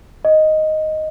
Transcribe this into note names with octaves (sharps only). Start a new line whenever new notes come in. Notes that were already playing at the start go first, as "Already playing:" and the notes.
D#5